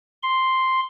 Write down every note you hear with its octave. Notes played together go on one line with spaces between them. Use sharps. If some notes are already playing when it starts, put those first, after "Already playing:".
C6